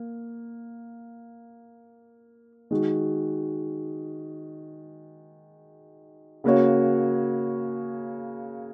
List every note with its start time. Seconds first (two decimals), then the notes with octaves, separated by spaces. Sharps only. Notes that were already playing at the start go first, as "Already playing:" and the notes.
Already playing: A#3
2.71 D#3 G#3 F#4
6.44 C#3 A#3 F#4 C#5